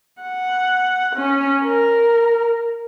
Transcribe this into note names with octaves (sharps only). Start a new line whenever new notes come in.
F#5
C#4
A#4